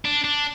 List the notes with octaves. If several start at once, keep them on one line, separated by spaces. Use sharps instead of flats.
D4
D4